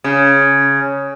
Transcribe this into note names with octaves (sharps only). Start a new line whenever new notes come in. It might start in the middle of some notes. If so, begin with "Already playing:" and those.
C#3